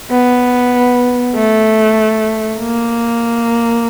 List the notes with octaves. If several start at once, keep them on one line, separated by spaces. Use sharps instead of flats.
B3
A3
A#3